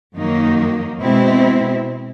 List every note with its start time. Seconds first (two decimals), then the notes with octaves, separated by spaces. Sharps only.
0.16 F#2 D#3 F#3 A#3 D#4
1.00 B2 G#3 C4 E4